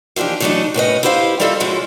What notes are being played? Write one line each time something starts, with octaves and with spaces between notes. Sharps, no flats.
E3 F3 D4 D#4 G4
C#3 E3 F#3 A3 D4 D#4
A2 C#4 B4 D#5
E4 G4 B4 C5 D#5 F5
G3 A#3 F4 A4 D#5 E5
A2 F3 G#3 C#4 E4 F#4